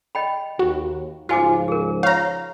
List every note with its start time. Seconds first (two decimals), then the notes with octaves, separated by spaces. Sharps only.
0.15 D#5 G5 B5
0.59 D#2 F#4
1.29 C#2 G#2 F3 F4 F#4 G#5 D6
1.68 G#4 A#4
2.03 C#5 F5 A#5 C#6